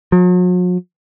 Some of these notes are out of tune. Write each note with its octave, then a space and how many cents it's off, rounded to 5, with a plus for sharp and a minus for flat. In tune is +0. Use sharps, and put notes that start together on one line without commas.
F#3 -45